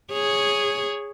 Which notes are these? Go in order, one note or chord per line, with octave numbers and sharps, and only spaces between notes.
G#4 C#5